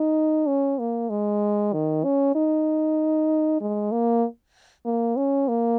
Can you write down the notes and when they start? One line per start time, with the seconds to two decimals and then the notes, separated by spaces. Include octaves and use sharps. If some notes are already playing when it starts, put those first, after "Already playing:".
Already playing: D#4
0.47 C#4
0.79 A#3
1.09 G#3
1.73 D#3
2.04 C#4
2.35 D#4
3.60 G#3
3.92 A#3
4.85 A#3
5.17 C#4
5.48 A#3